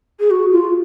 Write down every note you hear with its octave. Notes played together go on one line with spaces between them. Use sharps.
G#4
F#4
F4